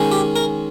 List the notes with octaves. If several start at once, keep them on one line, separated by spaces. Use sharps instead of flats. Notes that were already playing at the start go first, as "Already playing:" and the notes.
Already playing: D#3 G#3 C#4
G4
A#4